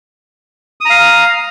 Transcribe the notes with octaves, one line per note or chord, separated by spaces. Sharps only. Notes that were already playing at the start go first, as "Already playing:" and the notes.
F5 A#5 D#6